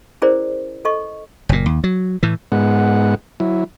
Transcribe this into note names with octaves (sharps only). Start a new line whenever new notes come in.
C#4 E4 G#4 A#4 C5 D5
A4 D#5 C#6
F#1 A#2
D#2
F#3
A2 E3
G#2 G#3 B3 F#5
F#3 E4